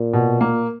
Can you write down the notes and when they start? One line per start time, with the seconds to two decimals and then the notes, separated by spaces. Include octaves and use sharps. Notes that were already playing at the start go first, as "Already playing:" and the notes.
Already playing: A#2
0.13 B2
0.41 A#3